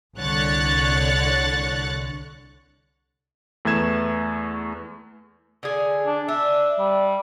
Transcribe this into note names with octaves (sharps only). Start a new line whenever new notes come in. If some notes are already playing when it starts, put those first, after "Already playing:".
C2 D3 C#5 F#6 A6 C#7
E2 A3 B4 G#6 E7
D3 G#4
D4
D4 E5
G3